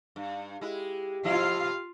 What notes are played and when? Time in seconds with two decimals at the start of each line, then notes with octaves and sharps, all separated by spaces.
0.16 G2
0.61 G#3 E4 G4
1.24 F3 E4 F4 D#5 F5